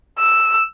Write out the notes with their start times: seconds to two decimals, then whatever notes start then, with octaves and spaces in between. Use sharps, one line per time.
0.19 E6